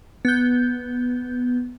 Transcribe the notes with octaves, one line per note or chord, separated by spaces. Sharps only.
B3 G6